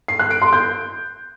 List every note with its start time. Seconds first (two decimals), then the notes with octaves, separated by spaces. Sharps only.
0.08 C7
0.19 F#6
0.31 D7
0.42 C6
0.53 G6